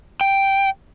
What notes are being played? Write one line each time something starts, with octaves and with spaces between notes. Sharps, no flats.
G5